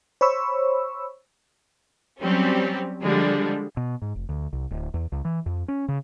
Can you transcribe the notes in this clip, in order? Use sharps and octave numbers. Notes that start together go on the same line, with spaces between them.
C5 C#5 B5 C#6 E6
F#3 G3 C4 C#4 G4
D3 F3 G3 G#3 D4
B2
G#2
F1
D2
C2
D1
E2
C#2
E3
F2
C#4
C#3